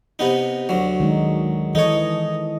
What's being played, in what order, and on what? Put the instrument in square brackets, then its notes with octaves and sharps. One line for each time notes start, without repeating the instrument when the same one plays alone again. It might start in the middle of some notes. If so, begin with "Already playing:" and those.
[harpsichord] C3 B3 D#4
D2 F#3
[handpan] D#3 G#3 D#4
[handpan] E3 A4 D#5 [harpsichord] D#4 C#5